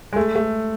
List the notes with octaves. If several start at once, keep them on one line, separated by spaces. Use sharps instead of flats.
G#3
A3
A3